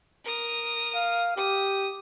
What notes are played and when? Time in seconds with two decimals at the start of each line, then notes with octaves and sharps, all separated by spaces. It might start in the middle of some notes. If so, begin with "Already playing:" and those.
0.24 A#4 D#6
0.95 F5
1.37 G4 D#6